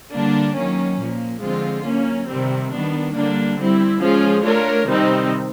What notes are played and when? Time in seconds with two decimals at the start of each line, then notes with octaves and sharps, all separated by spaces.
0.13 D3 G3 A#3 D4
0.56 D#3 F#3 A#3 C#4
0.99 A#2 F3 A#3
1.42 D3 F3 G#3 C4 F4
1.85 F#3 A#3 C#4
2.28 C3 D#3 G3 C4
2.71 D#3 G3 B3 D4
3.14 D3 G3 A#3 D4
3.58 G3 C4 E4
4.01 F3 G#3 C#4 F4 G#4
4.43 A3 D4 F4 A#4 C#5
4.87 C3 D#3 G3 C4 D#4